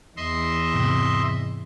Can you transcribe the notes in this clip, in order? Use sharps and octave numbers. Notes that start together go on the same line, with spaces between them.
E2 D#5 E5 C6
G#2 C3